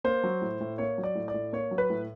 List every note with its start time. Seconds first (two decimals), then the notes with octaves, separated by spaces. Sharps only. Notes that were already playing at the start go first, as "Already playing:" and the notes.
0.04 A#3 C5
0.24 F#3
0.42 A2
0.60 A2
0.78 A#3 C#5
0.98 F#3
1.04 D5
1.15 A2
1.28 D5
1.34 A2
1.53 A#3 C#5
1.71 F#3
1.78 B4
1.90 A2